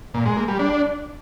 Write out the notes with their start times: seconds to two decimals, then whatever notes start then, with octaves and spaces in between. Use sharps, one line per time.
0.14 A#2
0.26 G#3
0.37 A#3
0.48 G3
0.59 D4